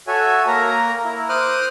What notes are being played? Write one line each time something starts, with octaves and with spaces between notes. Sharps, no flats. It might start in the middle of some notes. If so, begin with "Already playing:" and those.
F#4 A4 C#5 E5 G#5
A#3 A#4 A#5
E4
C5 D6 D#6 F6 F#6